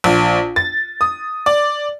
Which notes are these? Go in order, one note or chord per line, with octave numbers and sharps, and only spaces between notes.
A#1
A6
D#6
D5